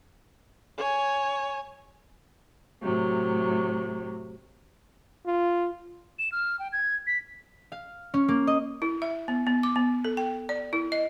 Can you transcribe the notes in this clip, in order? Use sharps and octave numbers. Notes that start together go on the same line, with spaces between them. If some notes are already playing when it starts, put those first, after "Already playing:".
C#5 G#5
A2 C3 F#3
F4
E7
F6
G5
G#6
B6
F5
C#4
A#3
D#5
E4
E5
B3
B3
D6
B3
A4
G5
D5
E4
D#5